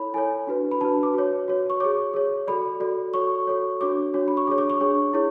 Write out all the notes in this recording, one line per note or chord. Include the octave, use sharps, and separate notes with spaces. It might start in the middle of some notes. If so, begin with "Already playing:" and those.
Already playing: E4 A4 C#5 B5
E4 A4 C#5 G#5
D4 F#4 B4
B5
D4 F#4 B4 A5
D6
F#4 C#5
F#4 C#5
C#6
G#4 C#5 D6
G#4 C#5
F#4 A4 D5 B5
F#4 A4 D5
F#4 A4 C#5 C#6
F#4 A4 C#5
D4 F#4 C#5 D6
D4 F#4 C#5
B5
C#6
D4 G#4 C#5 D6
D6
C#6
D4 G#4 C#5
E4 G#4 C#5